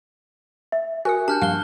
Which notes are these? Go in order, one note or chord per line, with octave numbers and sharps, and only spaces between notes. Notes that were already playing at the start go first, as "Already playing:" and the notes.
E5
F#4 A#4 G#5 D#6 F#6 C#7
D4 G4 A5 F6 G6
G2 A#2 F3 F5 F6 F#6 G7